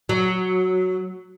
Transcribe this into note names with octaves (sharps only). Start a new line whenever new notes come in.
F#3